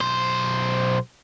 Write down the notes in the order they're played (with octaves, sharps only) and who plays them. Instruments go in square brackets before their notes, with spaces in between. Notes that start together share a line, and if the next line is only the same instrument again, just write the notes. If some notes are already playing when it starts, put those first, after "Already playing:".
[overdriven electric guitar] B1 C5